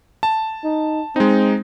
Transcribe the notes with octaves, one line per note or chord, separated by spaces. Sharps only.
A5
D#4
G#3 C4 D#4